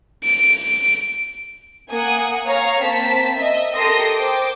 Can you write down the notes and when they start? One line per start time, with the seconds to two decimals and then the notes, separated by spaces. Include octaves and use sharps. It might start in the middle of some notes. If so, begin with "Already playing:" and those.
0.24 D7
1.91 A#3 F#5 G#5 D#6
2.46 C#5 F5 A#5
2.82 A#3 C4 A5 B6
3.38 D#5 E5
3.75 G4 A4 A#4 C6 D#6 A#6
4.14 C5 G5 D6